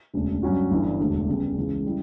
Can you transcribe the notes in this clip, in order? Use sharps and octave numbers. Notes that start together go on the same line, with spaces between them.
E1 D2 C#3
G2 F#3 C#4 F#4
G1 G2 E3
E1 D2 D3
E2 C#3 G3
C#2 C#3 E3
C#3 G3 E4